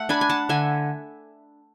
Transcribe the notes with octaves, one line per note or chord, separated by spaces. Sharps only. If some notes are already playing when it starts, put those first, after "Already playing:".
Already playing: A3 E5 F#5
D4 G#5 B5
G#5
F#5 A5
D3 E5 G#5